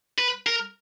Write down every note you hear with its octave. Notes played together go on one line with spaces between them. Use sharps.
B4
A#4